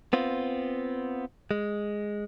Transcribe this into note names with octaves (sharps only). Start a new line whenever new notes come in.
B3 C4 F4
G#3